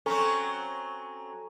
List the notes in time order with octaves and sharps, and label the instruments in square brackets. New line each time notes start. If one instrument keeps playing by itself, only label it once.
[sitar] F#3 C4 C#4 [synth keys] A4 G#5 A#5